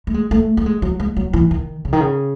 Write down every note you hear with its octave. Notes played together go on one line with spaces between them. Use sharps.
A3
G#3
A3
A3
G#3
F#3
G#3
F#3
E3
D#3
C#3
D#3
C#3